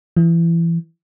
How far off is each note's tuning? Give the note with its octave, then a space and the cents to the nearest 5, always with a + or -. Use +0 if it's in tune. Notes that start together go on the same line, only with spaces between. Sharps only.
E3 +25